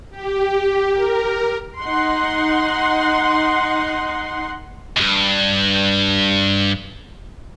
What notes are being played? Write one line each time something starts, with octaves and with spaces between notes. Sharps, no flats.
G4
A#4
D#4 F#5 C6
C#2 G2